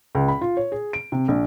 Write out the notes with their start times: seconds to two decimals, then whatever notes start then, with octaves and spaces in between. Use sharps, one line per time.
0.15 C#2
0.28 B5
0.41 F4
0.57 C#5
0.72 G#4
0.93 D7
1.12 C3
1.28 A#1